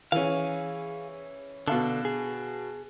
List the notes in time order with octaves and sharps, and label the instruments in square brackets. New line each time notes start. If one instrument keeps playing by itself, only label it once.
[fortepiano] E3 C#4 [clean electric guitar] G#4 F5
[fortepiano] B2 F5 A5 [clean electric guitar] D3
[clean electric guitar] G#4